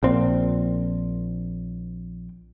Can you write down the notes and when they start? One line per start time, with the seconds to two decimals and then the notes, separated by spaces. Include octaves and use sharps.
0.03 A#1 A#2 C4